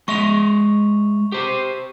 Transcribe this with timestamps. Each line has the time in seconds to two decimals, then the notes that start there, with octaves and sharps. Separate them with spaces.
0.08 G#3 D#5 E5 C#6 F7
1.32 G4 C5